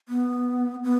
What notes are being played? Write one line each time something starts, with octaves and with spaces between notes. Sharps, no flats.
B3
B3